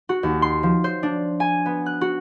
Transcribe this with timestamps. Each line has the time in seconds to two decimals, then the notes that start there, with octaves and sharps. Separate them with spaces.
0.09 F#4
0.23 D#2
0.42 C6
0.63 F3
0.84 C5
1.03 D4
1.40 G#5
1.66 B3
1.86 F#6
2.01 F#4